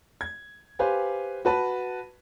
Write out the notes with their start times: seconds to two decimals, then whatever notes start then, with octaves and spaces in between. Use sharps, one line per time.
0.21 G#6
0.79 G4 B4 C5 F5 G#5
1.45 F#4 B4 A5 B5